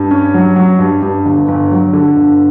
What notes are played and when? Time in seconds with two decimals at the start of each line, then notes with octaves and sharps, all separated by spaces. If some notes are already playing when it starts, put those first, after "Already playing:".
Already playing: G2
0.11 C#4
0.34 F#3
0.56 F#3
0.79 G2
1.02 G2
1.26 G1
1.48 G1
1.71 F#3
1.93 D3
2.16 G1